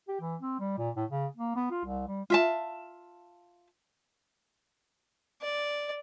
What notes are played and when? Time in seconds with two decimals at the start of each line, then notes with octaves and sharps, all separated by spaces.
0.08 G4
0.21 E3
0.41 C4
0.59 G3
0.78 A#2
0.96 A2
1.10 C#3
1.37 A#3
1.56 B3
1.71 F4
1.85 C2
2.07 G3
2.30 F4 E5 A5
5.42 D5